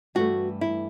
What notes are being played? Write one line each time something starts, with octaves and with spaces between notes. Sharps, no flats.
G2 E3 A3 F#4
E4